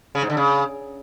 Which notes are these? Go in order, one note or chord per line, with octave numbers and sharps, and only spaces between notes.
C#3
G#2
D3
C#3